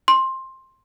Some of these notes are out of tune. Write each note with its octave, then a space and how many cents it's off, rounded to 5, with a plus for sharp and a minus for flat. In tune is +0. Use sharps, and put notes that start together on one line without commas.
C6 +15